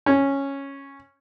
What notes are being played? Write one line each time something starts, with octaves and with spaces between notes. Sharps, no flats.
C#4